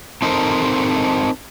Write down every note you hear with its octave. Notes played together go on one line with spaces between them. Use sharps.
C4 D#4 A4 A#4 C5